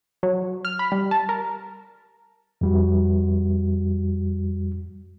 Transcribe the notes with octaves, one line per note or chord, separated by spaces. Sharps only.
F#3
F6
B5
G3
A5
A#4
F2 G3 F#4